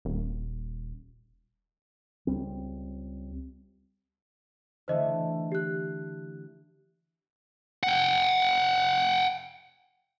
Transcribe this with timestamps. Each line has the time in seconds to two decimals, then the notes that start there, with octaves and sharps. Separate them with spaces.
0.05 D#1
2.27 C#2 G3 C4
4.88 D3 E3 A3 C5 D#5
5.52 G4 F#6
7.83 F#5 G5